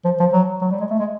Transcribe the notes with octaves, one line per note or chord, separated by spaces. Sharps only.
F3
F3
F#3
F#3
G3
G#3
A3
G#3